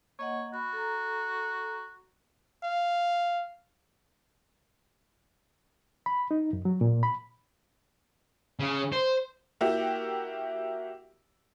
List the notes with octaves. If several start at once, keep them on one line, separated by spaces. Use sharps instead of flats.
A#3 C#5 D#5 F#5
F#4 B5
A4 A#5
F5
B5
D#4
F#2
F#3
A#2
B5
C#3
C5
A#3 E4 F#4 G4